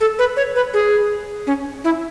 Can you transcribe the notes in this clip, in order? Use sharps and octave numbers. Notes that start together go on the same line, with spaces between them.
A4
B4
C#5
B4
G#4
C#4
E4